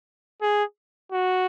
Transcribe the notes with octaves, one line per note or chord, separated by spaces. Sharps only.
G#4
F#4